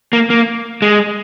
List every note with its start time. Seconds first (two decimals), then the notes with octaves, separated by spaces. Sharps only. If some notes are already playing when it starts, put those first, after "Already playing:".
0.13 A#3
0.30 A#3
0.82 G#3